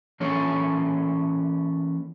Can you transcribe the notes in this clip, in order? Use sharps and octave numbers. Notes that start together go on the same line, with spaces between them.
E3 A#3 C#4 A4 C#5